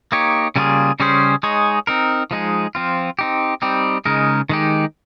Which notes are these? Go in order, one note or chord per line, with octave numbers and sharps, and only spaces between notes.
A#3 D#4 G4 C#5
C#3 G3 A#3 F4 G#4
C#3 G3 C#4 G#4 C5
G#3 D#4 G#4 C#5
C4 D#4 A#4
F3 G#3 D#4 G#4
F3 C4 F4
C4 D#4 G4
G3 C4 D#4 G4
C#3 G#3 D#4 A#4
D#3 G#3 D#4 G4